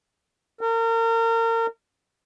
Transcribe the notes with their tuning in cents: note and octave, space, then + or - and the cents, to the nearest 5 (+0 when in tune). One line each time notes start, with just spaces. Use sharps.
A#4 -35